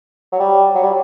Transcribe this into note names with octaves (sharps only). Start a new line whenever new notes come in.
F#3
G3
F#3
G3